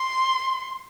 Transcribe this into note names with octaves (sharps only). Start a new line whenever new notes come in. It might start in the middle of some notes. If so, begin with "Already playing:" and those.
Already playing: C6